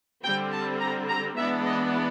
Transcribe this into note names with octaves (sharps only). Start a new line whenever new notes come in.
D3 G3 C4 G5
A5
A#5
A#5
E3 G#3 B3 D4 E5
D#5